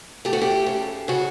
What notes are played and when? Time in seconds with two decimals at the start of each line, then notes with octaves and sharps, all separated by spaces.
0.25 A3 G4
0.33 F#4
0.41 G4
0.66 C#3
1.08 C#3 F#4